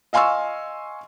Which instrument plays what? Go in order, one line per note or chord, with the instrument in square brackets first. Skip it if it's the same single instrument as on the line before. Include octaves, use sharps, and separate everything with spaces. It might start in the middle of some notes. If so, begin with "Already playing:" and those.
[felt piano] D#5 F5 G#5 C6 C#6 E6